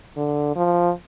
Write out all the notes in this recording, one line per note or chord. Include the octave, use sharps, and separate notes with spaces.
D3
F3